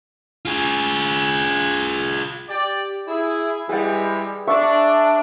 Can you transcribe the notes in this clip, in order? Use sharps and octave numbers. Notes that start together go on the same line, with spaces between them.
F4 G#4
G4 D5
E4 G#4
E3 G3 G#3 G#4 G5
D4 E5 C#6